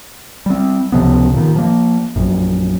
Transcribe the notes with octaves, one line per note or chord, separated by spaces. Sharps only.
G3 C4
C#2 C3 F3 B3
A#2 D#3
F3 A#3
A#1 F#2